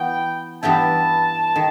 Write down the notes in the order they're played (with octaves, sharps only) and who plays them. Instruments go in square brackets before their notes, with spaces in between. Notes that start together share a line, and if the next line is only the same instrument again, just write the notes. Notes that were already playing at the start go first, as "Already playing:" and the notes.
Already playing: [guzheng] E3 B3 F#4 [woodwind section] G5
[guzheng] G2 E3 B3 E4 G4 [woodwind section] A5
[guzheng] D#3